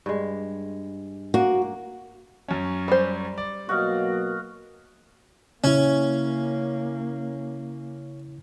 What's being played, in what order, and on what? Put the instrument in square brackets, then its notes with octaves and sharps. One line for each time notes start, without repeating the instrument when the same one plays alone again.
[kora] G2 G#3
[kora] A#3 [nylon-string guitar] F#4
[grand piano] F#2 C#4
[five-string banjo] G3 C5
[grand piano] D5
[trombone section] B2 F#3 A#3 [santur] F#4 D#5 F5
[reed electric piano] C#3 E4 [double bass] A#3 [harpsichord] C#4